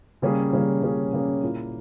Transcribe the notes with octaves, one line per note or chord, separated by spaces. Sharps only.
C#3 G3 A#3 C#4 G#4
C#3 G3 A#3 C#4 G#4
C#3 G3 A#3 C#4 G#4
C#3 G3 A#3 C#4 G#4
A#2 A#3 E4